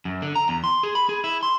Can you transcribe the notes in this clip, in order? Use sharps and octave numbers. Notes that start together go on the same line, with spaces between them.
F#2
D3
A#5
E2
C6
G#4
B5
G#4
E4
C6